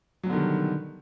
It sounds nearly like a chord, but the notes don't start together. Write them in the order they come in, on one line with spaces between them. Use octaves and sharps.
F#3 B2 D3 D#3 G3